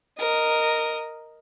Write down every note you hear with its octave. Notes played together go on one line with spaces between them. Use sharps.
A#4 D#5